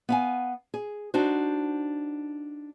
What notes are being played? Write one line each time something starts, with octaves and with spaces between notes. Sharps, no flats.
B3 F5 G#5
G#4
D4 D#4 F#4 C5